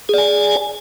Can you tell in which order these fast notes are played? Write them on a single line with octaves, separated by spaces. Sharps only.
G#4 D5 G#5